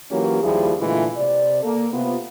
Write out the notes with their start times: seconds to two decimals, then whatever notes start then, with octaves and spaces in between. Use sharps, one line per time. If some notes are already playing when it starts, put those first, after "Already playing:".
0.11 E3 F#3 A#3 C#4 F4 G4
0.42 D#2 F3 G3 E4 G#4
0.79 A#2 D3 E3 G#3 A3 F4
1.16 C3 D5
1.63 A#3 A4
1.93 C3 B3 F4